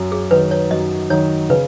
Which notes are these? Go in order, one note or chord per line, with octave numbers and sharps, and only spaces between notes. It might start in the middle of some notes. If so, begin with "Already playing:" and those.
Already playing: F#2
G#4
D#3 F#3 D#4 B4
C#5
F#2 D#5
D#3 F#3 D#4 C#5
C#3 B4